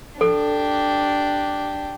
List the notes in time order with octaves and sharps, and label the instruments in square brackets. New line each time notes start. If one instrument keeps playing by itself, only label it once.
[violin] D4 G4 [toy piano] A4